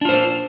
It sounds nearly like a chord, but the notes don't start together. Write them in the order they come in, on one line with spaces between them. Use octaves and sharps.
D4 F4 C5